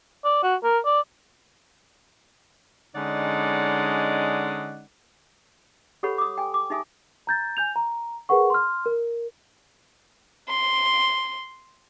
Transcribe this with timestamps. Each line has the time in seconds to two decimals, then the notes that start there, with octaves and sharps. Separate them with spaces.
0.25 D5
0.43 F#4
0.63 A#4
0.85 D5
2.96 D3 G#3 C#4 D#4 D5 F#5
6.03 G4 A4 B4 C#5 F#5 B5
6.18 D6 D#6
6.38 G5 G#5
6.54 D6
6.70 D#4 G4 E5 G#5 D#6
7.27 A#5 G6 A6
7.57 G#5 G6 F7
7.76 A#5
8.29 G#4 A#4 B4 F#5 C#6
8.50 C6 F6
8.86 A#4
10.50 C6